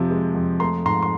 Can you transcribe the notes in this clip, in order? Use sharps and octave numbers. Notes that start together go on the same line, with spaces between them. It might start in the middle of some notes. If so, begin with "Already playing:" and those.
Already playing: F2 C3 F3
G#3
F2
A3 A#5 C6
G#2 A#5 C6
C6